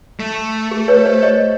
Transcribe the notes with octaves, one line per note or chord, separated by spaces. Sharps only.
A3
G#4
B4 C#5
C5 D5
C#5 D#5